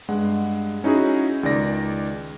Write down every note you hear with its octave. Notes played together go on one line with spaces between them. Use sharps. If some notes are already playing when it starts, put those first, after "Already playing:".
G2 G#3 F#5
C#4 D#4 E4 F#4 G#4
C#2 D#3 G#3 D5 A#6